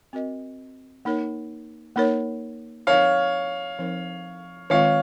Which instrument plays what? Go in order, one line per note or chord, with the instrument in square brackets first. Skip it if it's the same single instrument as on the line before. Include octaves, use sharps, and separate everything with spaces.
[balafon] C4 F#4 A#4 D#5
A#3 D#4 A#4 C#5
A#3 D#4 A#4 C#5
[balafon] F3 C4 D#4 A#4 [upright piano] C#5 F5
[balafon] F3 C4 D#4 A#4
[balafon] D#3 G#3 C4 F4 [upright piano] C#5 F5